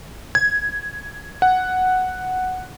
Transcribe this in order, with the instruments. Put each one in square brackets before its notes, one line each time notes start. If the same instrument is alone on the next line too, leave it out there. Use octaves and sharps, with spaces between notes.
[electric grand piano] G#6
F#5